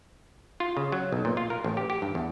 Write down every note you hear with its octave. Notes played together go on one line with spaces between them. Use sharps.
F4
C#3
F#3
B1
A#2
F4
A#4
A1
G4
G4
G2
E2